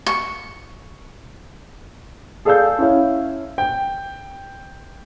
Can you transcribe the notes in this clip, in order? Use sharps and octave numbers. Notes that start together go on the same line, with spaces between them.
C#6
G#4 A4 D5 F5 E6 G6
C#4 E4 C#5 F5
G5